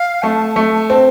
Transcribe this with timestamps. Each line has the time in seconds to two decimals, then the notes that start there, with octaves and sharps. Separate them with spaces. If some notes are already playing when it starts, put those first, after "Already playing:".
Already playing: F5
0.22 A3 A5
0.56 A3
0.90 C4